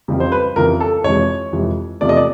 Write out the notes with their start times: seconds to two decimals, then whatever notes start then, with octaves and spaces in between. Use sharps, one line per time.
0.08 F2 C#3 E3 G3
0.20 C5
0.32 B4
0.56 F2 C#3 E3 G3 A#4
0.80 A4
1.04 F2 C3 E3 G#3 C#5
1.52 F2 C3 E3 G#3
2.01 E2 C3 F3 A3 D5
2.09 D#5
2.17 D5